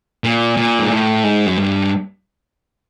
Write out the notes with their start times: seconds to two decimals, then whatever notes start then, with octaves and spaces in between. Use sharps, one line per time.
0.24 A#2
0.57 A#2
0.79 G#2
0.91 A2
1.24 G#2
1.46 F#2
1.57 G2